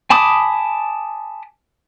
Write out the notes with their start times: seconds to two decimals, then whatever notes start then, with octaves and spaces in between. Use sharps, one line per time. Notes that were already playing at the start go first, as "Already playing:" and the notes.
0.10 G#5 A5 B5 D6 D#6